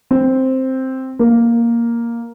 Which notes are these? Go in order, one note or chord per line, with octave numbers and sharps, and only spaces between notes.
C4
A#3